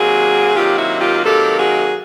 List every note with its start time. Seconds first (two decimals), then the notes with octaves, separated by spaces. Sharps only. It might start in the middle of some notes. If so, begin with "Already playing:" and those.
Already playing: C3 D#3 F#3 A#3 F#4 G#4
0.55 C3 D#3 F#3 A#3 F4 G4
0.78 E4 F#4
1.01 F4 G4
1.23 C3 D#3 F#3 A#3 G4 A4
1.59 F#4 G#4